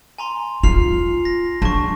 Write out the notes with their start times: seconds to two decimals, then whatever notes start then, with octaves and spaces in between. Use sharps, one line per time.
0.18 G#5 A#5 C6
0.63 F4 F6 C7 F7
1.25 A#6
1.62 D4 A5 C#6